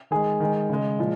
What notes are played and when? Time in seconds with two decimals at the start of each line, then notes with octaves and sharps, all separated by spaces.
0.11 D#3 G#3 G#4
0.40 D#3 G#3
0.69 C#3 G#3
0.99 A#2 F3 G#3